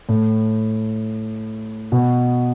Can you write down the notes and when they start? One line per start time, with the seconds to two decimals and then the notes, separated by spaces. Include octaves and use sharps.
0.09 A2
1.92 B2